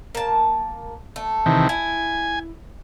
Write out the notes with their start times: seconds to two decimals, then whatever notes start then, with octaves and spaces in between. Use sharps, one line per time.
0.15 A#3 A5
1.16 A3
1.46 C3 D#3 E3
1.69 E4 G#5